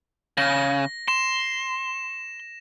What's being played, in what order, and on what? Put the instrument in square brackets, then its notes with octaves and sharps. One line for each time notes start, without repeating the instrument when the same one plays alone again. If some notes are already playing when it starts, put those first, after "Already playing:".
[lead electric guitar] C#3 [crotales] A#6
[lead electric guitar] C6 [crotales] E7